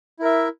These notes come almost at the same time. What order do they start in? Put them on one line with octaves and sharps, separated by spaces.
E4 A#4 E5